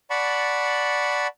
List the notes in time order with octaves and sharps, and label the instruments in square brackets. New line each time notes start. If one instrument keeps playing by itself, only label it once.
[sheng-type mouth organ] D5 F#5 A5 B5 C#6